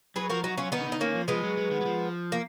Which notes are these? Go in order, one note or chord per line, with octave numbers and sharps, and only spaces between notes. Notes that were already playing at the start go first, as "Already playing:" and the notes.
F#3 G#4 B4
F3 F#4 A#4
F#3 D#4 F#4
F#3 C#4 F4
D#3 B3 D#4
C#3
D#3
D#4
D#3 A#3 C#4
F3
F3 G#3 B3
F#3
F#3
D#3
F#3
F3
A#3